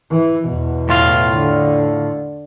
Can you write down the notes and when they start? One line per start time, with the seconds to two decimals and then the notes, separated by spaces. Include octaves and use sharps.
0.11 E3
0.48 E2 B2
0.89 A2 F4 F5
1.37 D3